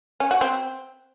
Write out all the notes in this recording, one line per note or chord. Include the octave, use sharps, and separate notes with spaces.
C#4
F#4
C4